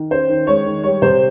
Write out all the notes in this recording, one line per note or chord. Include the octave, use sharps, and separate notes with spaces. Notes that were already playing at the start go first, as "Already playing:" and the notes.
Already playing: D#3
C#4 C5
D#3
G#3 C#5
D#3
G3 C#5
C3 C5